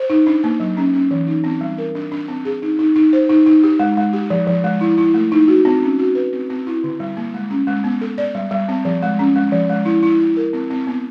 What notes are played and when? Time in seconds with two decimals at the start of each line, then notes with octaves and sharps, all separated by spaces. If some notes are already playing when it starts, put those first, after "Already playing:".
Already playing: C5
0.10 D#4
0.27 D4
0.44 A#3
0.60 F#3
0.77 C#4
0.94 C#4
1.11 E3
1.27 D#4
1.44 C4
1.61 G3
1.78 A#4
1.95 D4
2.12 D4
2.29 C4
2.45 G#4
2.62 D#4
2.79 D#4
2.96 D#4
3.13 C5
3.29 D#4
3.46 D#4
3.64 G4
3.79 G#3
3.97 G#3
4.13 G4
4.30 F3
4.47 F3
4.64 G#3
4.81 E4
4.98 E4
5.14 A3
5.32 D#4
5.48 F#4
5.65 C4
5.82 C#4
5.99 F#4
6.15 B4
6.33 C4
6.50 C4
6.67 E4
6.84 D3
7.00 G3
7.17 A#3
7.34 G#3
7.51 C#4
7.67 G#3
7.84 B3
8.01 A4
8.18 D5
8.35 G3
8.51 G3
8.69 C4
8.85 F3
9.02 G#3
9.19 C#4
9.36 G#3
9.52 F3
9.70 G#3
9.85 E4
10.03 E4
10.20 E4
10.37 A#4
10.53 C4
10.70 C4
10.87 B3